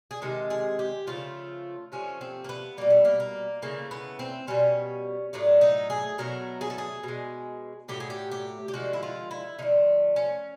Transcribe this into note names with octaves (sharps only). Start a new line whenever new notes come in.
G#4
C3 D#3 G#3 A4
G#4
G4
C#3 F3 A3 F4
C3 F3 A3 C#4
C4
A#3
B3
B2 G3 A#3
A3
A#3
A#3
C#3 E3 A3 A#3
B3
C4
B2 G3 C#4
A2 F#3 A3 D4
D#4
G#4
B2 F#3 A3 A#4
G#4
A4
G#4
B2 G#3
A2 F#3 A3 G4
G#4
G4
G4
G4
D3 F3 G#3 F#4
E4
F4
E4
D3 F3 A3 D#4
C#4